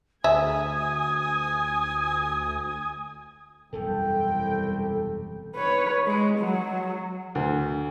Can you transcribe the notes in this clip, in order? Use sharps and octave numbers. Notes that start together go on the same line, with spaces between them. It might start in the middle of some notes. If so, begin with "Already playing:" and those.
D2 G#4 E5 G#5 D#6
E1 C2 F#2 E3 A4 G5
B4 C#5
G#3
F#3
D2